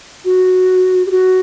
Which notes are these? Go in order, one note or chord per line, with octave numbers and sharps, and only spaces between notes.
F#4
G4
F#4